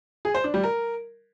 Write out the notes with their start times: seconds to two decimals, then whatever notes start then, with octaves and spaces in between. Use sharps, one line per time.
0.25 G#4
0.34 C5
0.44 D4
0.54 G3
0.63 A#4